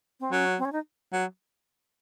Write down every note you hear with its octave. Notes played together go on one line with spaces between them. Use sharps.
C4
F#3 C#4
C4
C#4
D#4
F#3